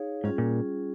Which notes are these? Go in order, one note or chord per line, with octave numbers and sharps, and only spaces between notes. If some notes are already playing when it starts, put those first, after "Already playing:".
Already playing: D#4 G#4 C#5 F5
G#2 G3 C#4 F4 G#4
A#2